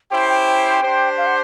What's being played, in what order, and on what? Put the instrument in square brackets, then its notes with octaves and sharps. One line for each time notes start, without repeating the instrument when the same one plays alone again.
[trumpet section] C#4 E4 G4 C5 [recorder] G5
[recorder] G5
[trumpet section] D4 G4 C5
[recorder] F5
F#5